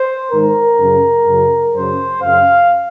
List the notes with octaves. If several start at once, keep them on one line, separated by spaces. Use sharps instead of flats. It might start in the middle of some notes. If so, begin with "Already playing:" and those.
Already playing: C5
G#2 D#3 A#4
F#2 C#3
F#2 C#3
F#2 C#3 C5
F#2 C#3 F5